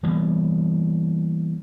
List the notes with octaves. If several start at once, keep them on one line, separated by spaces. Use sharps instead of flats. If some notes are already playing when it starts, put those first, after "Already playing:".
E3 G3 A#3 B3